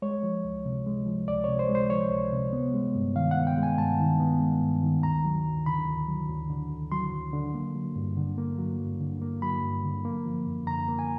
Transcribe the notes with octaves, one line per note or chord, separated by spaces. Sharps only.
G#3 C#5
F3
C#2
C3
G#3
F3
C#2 D5
C3 C#5
C5
G#3
C5
F3 C#5
C#2
C3
B3
G#3
G2
D#3 F5
F#5
B3
G5
G#3
G#5
G2 A5
D#3
B3
G#3
G2
D#3
D2 A#5
F#3
D2
D3 B5
D2
F#3
D2
D3
D2
F#3 C6
D2
D3
A#3
F#3
G2
D3
A#3
F#3
G2
D3
A#3
F#3 B5
G2
D3
A#3
F3
F#2
D3 A#5
A#3
G#5